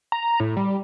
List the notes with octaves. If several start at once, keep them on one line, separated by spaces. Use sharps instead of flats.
A#5
A2
G3